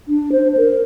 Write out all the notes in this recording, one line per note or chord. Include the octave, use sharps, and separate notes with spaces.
D4
C5
A#4